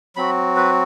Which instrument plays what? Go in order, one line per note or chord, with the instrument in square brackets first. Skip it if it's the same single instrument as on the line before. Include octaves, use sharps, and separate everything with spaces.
[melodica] F#3 C4 F#4 B5
B4